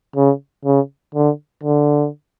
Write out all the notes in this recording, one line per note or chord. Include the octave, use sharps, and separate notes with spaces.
C#3
C#3
D3
D3